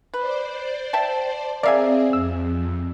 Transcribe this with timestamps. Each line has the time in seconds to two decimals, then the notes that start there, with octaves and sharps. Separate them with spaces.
0.14 B4 C5 D5
0.93 E5 G5 A5
1.63 C4 G#4 A#4 D5 E5 F5 G#5
2.13 F2 E6